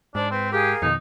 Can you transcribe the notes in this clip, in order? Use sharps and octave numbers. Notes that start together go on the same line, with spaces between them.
G#2 D4 C5
C4 B4
G4 G#4 A#4 F5
F2 B2 D#3 D#4